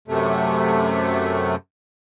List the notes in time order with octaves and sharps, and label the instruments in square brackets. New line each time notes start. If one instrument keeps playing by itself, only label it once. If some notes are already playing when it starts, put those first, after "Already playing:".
[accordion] F#2 C3 A3